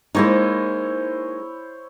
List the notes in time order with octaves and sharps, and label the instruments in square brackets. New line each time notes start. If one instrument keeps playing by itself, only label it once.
[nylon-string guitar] G#3 A#3 D#4 [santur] E4 C5 C#5